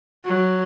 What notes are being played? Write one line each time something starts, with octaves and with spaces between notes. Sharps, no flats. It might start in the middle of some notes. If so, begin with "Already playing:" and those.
F#3